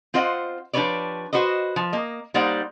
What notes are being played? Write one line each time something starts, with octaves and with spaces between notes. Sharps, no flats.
C4 F4 C5 D#5 F#5
F3 D4 G4 B4 C#5 D5
F#4 B4 C5 D#5
F3
A#3 D#5
G3 A#3 D#4 C5 D5 F#5